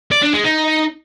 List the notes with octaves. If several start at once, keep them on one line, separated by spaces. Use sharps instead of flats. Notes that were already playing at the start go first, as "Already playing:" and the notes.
D5
D4
G#3
D#4